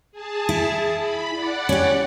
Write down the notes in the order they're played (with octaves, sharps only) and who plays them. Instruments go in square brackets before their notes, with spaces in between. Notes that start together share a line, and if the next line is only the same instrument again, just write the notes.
[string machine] G#4 A5
[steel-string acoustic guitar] E4
[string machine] B5
D5 F#5
[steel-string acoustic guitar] C#4 G4